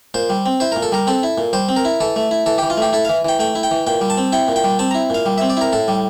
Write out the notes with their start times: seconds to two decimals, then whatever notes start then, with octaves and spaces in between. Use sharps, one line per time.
0.14 A#2 C5
0.30 G3
0.46 C4
0.60 E4 C5
0.72 A#2 A#4
0.82 A4
0.92 G3 A#4
1.07 C4 A4
1.23 E4
1.38 A#2
1.53 G3 C5
1.69 C4
1.76 A#4
1.85 E4
2.00 E3 A4
2.16 A3
2.31 E4
2.46 E3 A4
2.58 E3 G4
2.70 F4
2.77 A3 G4
2.93 E4 A4
3.05 E3 F5
3.25 E3 G5
3.39 A3 G5
3.55 E4
3.63 G5
3.71 E3
3.87 A#2 G5
4.01 G3
4.10 A5
4.17 C4
4.32 E4 G5
4.48 A#2
4.56 G5
4.64 G3
4.79 C4 A5
4.91 E4 A#5
5.10 A#2 F5
5.26 G3
5.38 C4 E5
5.50 D5
5.57 E4 A#4
5.73 A2 A4
5.88 G3